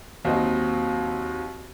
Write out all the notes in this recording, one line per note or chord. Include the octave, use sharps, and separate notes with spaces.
D#2 F#3 C4 D#5